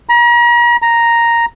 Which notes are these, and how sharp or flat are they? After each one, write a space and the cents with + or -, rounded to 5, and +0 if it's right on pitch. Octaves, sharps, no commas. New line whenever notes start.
A#5 +40
A#5 +0